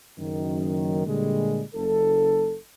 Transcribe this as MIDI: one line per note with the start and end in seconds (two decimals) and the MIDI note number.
0.19 1.05 30
0.19 1.05 42
0.19 1.05 51
1.07 1.61 46
1.07 1.61 50
1.07 1.61 55
1.07 1.61 56
1.75 2.55 30
1.75 2.55 69